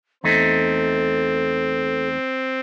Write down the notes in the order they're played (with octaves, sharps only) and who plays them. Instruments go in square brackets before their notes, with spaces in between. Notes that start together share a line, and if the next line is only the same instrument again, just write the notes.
[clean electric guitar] E2 A3 D#4 [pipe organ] C4 [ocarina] A4